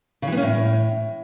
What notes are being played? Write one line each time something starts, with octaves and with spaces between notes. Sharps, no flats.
C#3
E3
B3
C#4
A2